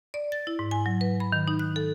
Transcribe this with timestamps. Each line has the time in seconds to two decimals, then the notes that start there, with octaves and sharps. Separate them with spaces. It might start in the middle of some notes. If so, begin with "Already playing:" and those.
0.14 D5
0.32 A6
0.47 E4
0.59 G#2
0.71 G#5
0.86 F#3
1.01 B4
1.20 B5
1.32 D#3
1.48 D#4
1.59 F#6
1.76 A4